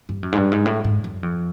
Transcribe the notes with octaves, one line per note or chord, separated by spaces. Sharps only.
G2
F#2
G#2
G2
G#2
A2
G#2
F#2
F2